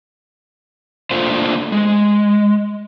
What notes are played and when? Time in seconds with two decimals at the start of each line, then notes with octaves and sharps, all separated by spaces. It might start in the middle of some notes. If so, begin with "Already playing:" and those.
1.11 A3 A#3 D4 F4 C5
1.72 G#3